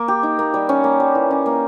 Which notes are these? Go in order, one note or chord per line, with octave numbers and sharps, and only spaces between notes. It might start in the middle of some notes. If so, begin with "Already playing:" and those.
Already playing: A#3
G4
D#4
A#3
G3
C#4
A#3
G3
E3
C#4
A#3